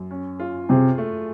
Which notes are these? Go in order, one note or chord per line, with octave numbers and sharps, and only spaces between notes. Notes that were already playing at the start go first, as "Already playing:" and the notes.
Already playing: F#2
C#4
F4
C3 G#4
A3